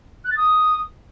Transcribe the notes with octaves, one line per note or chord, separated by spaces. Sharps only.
F#6
A6
D#6